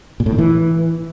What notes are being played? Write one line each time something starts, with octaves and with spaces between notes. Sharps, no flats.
A#2
A2
D#3
E3